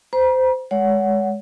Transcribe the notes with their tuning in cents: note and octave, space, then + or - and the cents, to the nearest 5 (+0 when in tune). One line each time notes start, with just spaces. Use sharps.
C5 -20 A#5 +45
G#3 +0 C#5 +35 F#5 +0